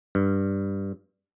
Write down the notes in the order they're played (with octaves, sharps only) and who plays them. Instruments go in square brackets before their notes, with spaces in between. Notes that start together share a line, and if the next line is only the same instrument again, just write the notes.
[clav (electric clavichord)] G2